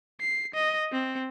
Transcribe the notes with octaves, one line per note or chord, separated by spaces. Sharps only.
C7
D#5
C4